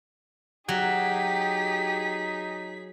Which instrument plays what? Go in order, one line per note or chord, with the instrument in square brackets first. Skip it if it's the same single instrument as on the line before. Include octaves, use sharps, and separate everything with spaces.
[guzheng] F#3 [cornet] D#4 [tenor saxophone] G4 [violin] G#4 B6